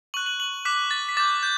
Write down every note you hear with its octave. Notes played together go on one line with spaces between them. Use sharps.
C#6 F#6 F#7
F#7
F#7
D6 F#6 B6
A6
B6
D6 G6 A6
G6